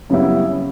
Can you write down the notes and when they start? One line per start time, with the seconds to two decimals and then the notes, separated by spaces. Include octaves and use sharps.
0.10 F#2 C#3 G3 B3 E4